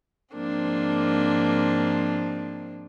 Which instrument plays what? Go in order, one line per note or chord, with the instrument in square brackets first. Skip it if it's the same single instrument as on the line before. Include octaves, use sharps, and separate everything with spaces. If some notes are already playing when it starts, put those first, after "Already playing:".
[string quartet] G#2 F3 A#3 C4 D4